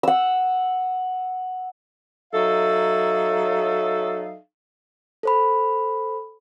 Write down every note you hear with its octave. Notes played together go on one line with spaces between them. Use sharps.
F#5 E6
F#3 D#4 A4 E5 F5
A4 C5 B5